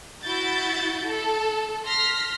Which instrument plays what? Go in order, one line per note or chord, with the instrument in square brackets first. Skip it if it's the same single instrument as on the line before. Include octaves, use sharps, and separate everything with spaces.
[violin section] E4 F#4 G6 A6
A4
C6 F6 A#6 B6